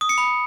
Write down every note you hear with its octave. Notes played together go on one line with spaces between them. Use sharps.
D#6
C#7
B5